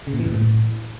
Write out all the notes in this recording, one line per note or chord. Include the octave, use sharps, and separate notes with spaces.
C#3
A#2
E3
F#2
A2